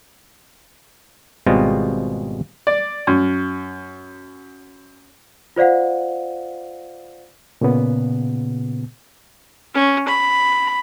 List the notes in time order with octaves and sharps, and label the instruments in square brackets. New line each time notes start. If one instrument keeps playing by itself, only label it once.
[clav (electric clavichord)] G#1 B2 G3 G#3 C4 F4
[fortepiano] D5
F#2
[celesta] F4 C5 D5 F5 F#5
[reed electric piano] A#2 C#3 B3
[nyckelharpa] C#4
B5